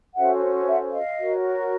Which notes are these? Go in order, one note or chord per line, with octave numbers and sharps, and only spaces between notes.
C#4 F#4 A4 C5 E5 F#5
E5 F#5
D#5 F5
F#4 A#4 C#5